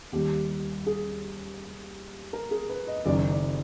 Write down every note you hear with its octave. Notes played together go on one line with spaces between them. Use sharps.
D#2 D#3 G3 G4
G#4
A#4
G#4
B4
D#5
F#1 F#2 D#3 D5
D5